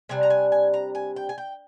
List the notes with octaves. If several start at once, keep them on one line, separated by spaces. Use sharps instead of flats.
C3 G3 D4 G#5
A#5
G#5
G#5
A#5
G#5
G5
G#5
G5